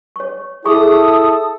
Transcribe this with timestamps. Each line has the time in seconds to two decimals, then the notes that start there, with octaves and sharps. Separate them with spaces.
0.16 C#5 C#6
0.65 E4 G#4 A4 A#5 C#6 D#6